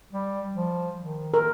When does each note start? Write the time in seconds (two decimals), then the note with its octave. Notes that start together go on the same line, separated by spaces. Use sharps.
0.12 G3
0.55 F3
1.01 D#3
1.34 A#4